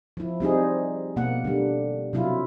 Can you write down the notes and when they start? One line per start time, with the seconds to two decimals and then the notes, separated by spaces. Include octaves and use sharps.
0.17 F3 E4
0.40 G3 C4 D#4 G#4
1.16 B2 A#3 F#5
1.44 D3 G3
2.13 C3 F#3 E4 F4